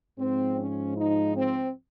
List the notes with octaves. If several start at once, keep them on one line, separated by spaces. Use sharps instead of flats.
G#2 F3 C4
C#4
D#4
C4